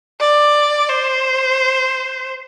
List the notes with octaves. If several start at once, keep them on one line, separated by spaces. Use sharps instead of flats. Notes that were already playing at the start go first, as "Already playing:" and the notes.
D5
C5